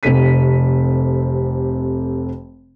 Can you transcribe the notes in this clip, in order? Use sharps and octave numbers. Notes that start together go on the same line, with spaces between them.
F1 C3 A4 B6 D#7